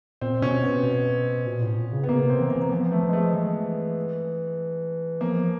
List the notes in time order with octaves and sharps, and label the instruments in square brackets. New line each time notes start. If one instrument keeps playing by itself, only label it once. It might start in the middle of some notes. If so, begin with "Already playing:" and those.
[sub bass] A#2 [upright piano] C4
[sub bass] B2 [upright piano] C#4
[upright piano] B3
[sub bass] B2
A#2
A2
A#2
C#3
[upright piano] B3
[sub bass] C#3 [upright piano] A#3
[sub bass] C3
[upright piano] C4
[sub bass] E3 [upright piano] B3
[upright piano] A#3
[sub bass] E3
[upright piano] A#3
[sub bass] F3 [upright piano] B3
[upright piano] A3
[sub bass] F3
[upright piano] G#3
A3
[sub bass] E3 [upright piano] A3
[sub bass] F3 [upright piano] A#3